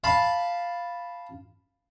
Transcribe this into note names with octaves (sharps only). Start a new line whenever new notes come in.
F5 A5 B5